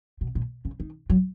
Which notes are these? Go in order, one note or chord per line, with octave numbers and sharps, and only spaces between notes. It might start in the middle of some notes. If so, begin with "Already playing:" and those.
B2
A#2
C#3
D#3
F#3